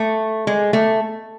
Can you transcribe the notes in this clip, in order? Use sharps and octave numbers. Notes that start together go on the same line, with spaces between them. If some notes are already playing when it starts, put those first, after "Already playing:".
Already playing: A3
G#3
A3